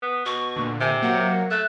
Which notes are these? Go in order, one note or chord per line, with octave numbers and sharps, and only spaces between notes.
B3
B2 C#6
A#2 D3
C3 G#5
F#3 A#3 F#5
A3 F#6